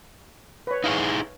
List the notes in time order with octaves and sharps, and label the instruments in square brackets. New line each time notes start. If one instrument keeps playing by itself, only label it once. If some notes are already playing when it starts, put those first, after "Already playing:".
[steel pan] B4 C#5
[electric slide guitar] D#4 E4 G#4 [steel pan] F5 C#6